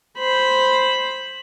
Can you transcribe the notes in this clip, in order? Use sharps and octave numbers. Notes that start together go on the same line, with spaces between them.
C5 B5